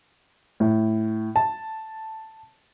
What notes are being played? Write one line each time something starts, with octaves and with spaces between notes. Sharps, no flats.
A2
A5